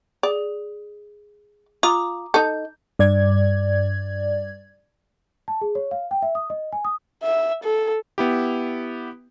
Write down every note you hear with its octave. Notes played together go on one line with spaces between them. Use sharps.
G#4 D5
F4 A#5 D6 D#6
D#4 A4 G6
G2 D5 G#6
A5
G#4
C#5
F5
G5
E5
D#6
D#5
G#5
D#6
E5
A4
B3 E4 G4